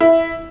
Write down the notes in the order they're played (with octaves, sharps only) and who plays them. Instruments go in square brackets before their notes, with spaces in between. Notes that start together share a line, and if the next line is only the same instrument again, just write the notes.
[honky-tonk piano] E4